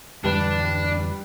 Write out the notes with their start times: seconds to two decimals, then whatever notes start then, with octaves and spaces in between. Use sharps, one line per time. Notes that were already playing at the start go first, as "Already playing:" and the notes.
0.24 F2 D3 E3 G3 D4 B4 E7